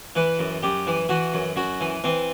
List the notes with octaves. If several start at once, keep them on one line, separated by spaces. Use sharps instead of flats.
E3 B4
F#2
F#2 G4
E3
E3 F#4
F#2
F#2 F#4
E3
E3 C4